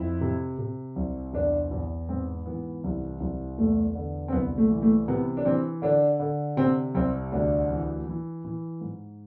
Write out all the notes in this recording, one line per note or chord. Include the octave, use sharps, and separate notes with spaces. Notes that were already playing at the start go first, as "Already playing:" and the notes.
Already playing: F2 E4
C3
C3
C2
E2 D4
E2
G#2 C4
E3 B3
C2
C2
E2 A3
D3
C4
C2 B3
A3
E3
A3
C3 B3
D4
E3 C4
D3 D4
D3
C3 C4
C2 C4
D2 D4
E3
E3
E3
G#2